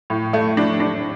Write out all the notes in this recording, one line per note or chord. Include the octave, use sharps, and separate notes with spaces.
A2
A3
D4
D4